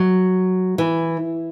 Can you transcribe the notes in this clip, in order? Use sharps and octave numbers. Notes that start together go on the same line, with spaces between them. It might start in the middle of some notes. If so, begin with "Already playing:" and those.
Already playing: F#3
E3